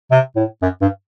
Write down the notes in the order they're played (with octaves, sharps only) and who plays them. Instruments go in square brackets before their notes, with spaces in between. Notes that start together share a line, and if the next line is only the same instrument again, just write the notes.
[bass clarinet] C3
A2
F#2
G2